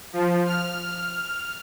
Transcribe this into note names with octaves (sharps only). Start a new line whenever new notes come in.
F3
F6